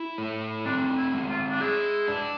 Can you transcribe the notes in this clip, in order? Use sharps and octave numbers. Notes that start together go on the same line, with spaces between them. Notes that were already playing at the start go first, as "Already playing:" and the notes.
Already playing: E4
A3
C4 D4
E4
G#3
F4
D4
E4 G#4
D4